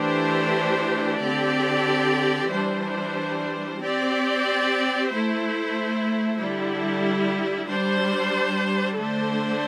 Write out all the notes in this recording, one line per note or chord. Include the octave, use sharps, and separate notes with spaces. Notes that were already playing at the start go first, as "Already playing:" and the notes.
Already playing: E3 A3 D4 G4 C5
D3 C4 G4 D5
E3 G3 D4 C5
C4 G4 D5
A3 E4 C5
D3 G3 E4
G3 D4 C5
D3 A3 D4 A4 C5